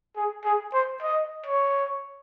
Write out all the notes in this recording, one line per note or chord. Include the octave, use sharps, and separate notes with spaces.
G#4
G#4
C5
D#5
C#5